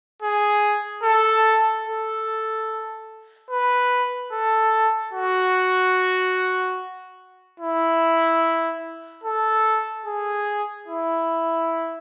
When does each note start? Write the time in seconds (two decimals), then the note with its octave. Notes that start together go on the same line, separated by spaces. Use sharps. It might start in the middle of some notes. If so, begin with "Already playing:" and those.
0.22 G#4
1.03 A4
1.86 A4
3.50 B4
4.32 A4
5.13 F#4
7.60 E4
9.24 A4
10.06 G#4
10.88 E4